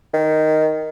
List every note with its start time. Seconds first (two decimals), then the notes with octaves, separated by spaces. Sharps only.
0.14 D#3